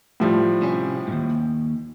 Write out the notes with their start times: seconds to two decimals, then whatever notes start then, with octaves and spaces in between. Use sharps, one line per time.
0.20 A2 F3 G3
0.62 C3 C#4
1.08 D#2 G#2